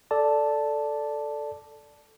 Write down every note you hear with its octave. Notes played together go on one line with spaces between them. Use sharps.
A4 D5 A5